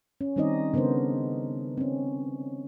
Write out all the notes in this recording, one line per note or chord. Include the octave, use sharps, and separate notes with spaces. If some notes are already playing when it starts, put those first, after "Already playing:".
C#4
D#3 G3 C4 D#4 D5 D#5
C#3 B3 D4 A#4 C5
C4 C#4